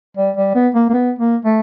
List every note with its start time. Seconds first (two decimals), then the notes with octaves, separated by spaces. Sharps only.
0.18 G3
0.37 G3
0.55 B3
0.75 A#3
0.90 A#3
0.94 B3
1.19 A#3
1.45 A3